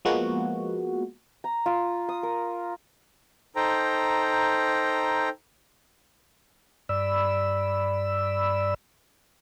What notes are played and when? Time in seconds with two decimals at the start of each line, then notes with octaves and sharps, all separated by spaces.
0.05 F3 G#3 A#3 B3 F#4
1.44 A#5
1.66 F4
2.09 D#6
2.23 A#4
3.56 D#4 A4 C5 G5 A#5
6.89 G2 D5 B5 E6